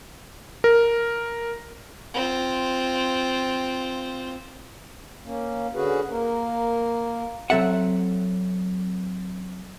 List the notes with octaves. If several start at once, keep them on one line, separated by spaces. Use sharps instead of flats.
A#4
C4 F4
A#3 C#4
D3 C#4 F#4 G#4 B4
A#3 A#4
F#3 C4 A4 E5 F#5